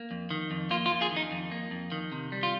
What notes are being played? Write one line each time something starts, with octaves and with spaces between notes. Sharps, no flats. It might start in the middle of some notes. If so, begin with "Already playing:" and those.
Already playing: A#3
F2
D#3
F2
A#3 F4
F4
F2
F4 G#4
D#3
D#4
F2
A#3
F2
D#3
C3
G3
F4